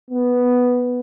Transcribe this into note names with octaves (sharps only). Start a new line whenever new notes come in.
B3